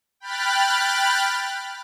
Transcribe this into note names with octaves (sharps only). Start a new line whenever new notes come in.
G5 B5 F6 F#6 A6